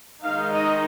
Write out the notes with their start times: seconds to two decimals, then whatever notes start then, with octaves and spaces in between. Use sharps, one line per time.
0.23 D#3 G#3 D#4 F5
0.53 D#5